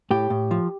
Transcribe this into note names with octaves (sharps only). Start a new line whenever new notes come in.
A2 G4
A2
F3